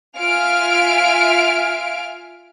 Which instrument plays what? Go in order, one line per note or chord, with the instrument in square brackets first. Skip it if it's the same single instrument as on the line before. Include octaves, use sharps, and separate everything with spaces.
[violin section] F4 E5 F5 G#5 F6 D7